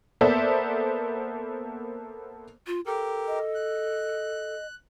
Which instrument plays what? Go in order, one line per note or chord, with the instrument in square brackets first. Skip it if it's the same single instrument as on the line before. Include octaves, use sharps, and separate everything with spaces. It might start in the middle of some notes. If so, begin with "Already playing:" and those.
[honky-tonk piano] A#3 B3 A4 C5 D5 E5
[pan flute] F4
[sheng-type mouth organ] G4 A#4 [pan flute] A4
[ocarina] D#5
[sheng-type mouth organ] F#6